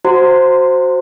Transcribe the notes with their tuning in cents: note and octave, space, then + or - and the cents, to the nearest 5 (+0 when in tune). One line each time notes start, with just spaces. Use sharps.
F#4 +0 C5 +0 A#5 -35